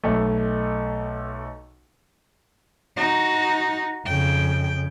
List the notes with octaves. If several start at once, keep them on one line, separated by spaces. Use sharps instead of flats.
B1 A3
D#4 F#4
F2 C#3 G5